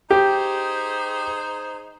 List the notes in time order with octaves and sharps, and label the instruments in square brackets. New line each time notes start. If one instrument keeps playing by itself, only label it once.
[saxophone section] D#4 G#4 C5 [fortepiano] G4